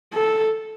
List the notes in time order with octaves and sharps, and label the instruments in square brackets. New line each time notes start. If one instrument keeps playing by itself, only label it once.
[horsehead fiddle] A4